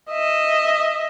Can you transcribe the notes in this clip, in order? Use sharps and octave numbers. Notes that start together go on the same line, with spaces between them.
D#5 E5